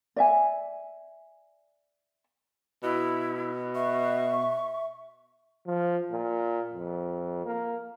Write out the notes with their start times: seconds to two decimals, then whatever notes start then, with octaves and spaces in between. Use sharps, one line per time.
0.16 D5 E5 G#5
2.83 B2 E4
3.75 E5 C#6
5.67 F3
6.12 A#2
6.73 F2
7.46 A#3